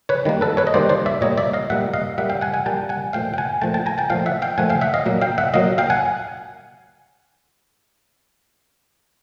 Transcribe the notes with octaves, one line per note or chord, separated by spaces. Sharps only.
B4 C#5
D#3 G3 A#3
A4 B4
B4 C#5
D#5
D#3 G3 A#3 C5 D5
C5 D5
D5 E5
A#2 G3 A#3 C#5 D#5
D5 E5
D#5 F5
A#2 G3 A#3 E5 F#5
D#5 F5
A#2 G3 A#3 E5 F#5
F5 G5
F#5 G#5
F#5 G#5
A#2 G3 A#3 G5 A5
F#5 G#5
A#2 F3 A3 F5 G5
G5
F#5 G#5
A#2 F3 A3 G5 A5
G5 A5
G#5 A#5
G5 A5
A#2 F3 A3 F5 G5
E5 F#5
F5 G5
A#2 F3 A3 F#5 G#5
F5 G5
E5 F#5
D#5 F5
A#2 F#3 A#3
F5 G5
E5 F#5
A#2 F#3 A#3 D#5 F5
F5 G5
F#5 G#5